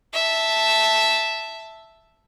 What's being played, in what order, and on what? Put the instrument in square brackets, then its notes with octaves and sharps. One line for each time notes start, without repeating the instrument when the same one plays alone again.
[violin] E5 A5